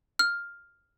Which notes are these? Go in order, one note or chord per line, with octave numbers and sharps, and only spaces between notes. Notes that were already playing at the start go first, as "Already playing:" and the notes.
F6